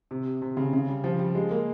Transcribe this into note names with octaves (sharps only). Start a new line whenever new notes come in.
C3
C3
C#3
C#3
G3
F3
G3
G#3
A#3